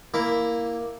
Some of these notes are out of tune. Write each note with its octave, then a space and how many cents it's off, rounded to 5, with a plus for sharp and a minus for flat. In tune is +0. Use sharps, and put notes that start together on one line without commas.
A#3 +0 E4 +0 D6 +0